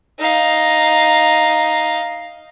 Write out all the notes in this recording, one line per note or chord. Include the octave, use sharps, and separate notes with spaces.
D#4 F5